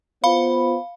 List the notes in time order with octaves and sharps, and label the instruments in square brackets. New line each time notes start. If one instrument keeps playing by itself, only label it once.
[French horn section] B3 F4 C5 [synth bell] F5 B5